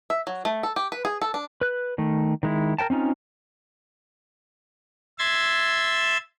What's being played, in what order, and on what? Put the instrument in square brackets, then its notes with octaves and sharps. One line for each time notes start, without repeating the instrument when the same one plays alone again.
[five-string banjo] E5
F#3
A3
A4
G4
B4
G#4
A4
D4
[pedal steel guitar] B4 F#6
D#3 A3
D#3 G#3 E4
A#4 B4 G5 A5
C4 C#4 D#4 F4
[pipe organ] E5 C6 E6 G#6 A6